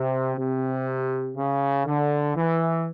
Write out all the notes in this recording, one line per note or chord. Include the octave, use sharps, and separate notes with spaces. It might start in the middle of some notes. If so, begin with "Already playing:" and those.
Already playing: C3
C3
C#3
D3
E3